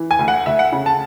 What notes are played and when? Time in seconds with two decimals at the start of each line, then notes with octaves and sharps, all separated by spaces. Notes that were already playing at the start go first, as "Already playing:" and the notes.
Already playing: E3
0.11 G#5
0.19 D2
0.28 F#5
0.46 D2 E5
0.59 F#5
0.72 C#3
0.86 A5